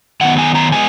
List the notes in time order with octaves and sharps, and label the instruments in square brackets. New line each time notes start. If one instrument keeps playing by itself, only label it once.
[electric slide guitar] D#3 F#3 B3 F#5
G#5
A#5
G#3 B3 G#5